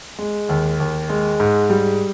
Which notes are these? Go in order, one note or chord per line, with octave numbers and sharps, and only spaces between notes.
G#3
D#2
D#2
G#3
G#2
G3